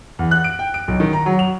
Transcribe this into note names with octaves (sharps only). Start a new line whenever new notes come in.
E2
F#6
D7
G5
D7
B1
D#3
A#5
F#3
F7